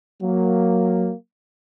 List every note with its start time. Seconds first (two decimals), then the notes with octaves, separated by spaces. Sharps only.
0.22 F#3 A#3